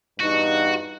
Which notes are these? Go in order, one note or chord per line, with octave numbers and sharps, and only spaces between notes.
E2 G2 D#4 F#4